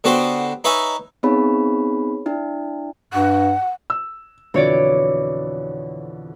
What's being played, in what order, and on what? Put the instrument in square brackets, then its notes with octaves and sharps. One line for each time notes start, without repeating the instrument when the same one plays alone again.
[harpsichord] D3 B3 F#4 G4 C5
D#4 B4 C#5 E5 G#5
[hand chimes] B3 C4 D#4 G#4 C#5 B5
D4 E4
[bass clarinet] G2 [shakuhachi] F#5
[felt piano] E6
[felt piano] F2 B2 D3 [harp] E3 C#5 D5